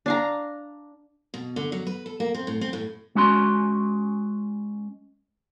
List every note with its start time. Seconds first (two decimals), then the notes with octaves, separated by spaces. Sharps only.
0.06 D4 F5 A#5
1.34 B2
1.56 D3
1.72 F#3
1.87 B4
2.06 A4
2.20 A#3
2.34 C4
2.47 A2
2.61 C4
2.73 A2
3.15 G#3 C#4 F#4 C6